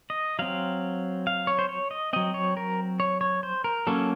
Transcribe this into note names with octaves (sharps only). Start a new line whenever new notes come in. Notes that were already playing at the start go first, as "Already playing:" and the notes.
D#5
F#3 C4 F5
F5
C#5
C5
C#5
D#5
F#3 C4 D#5
C#5
A#4
C#5
C#5
C5
A#4
F#3 A#3 C#4 A4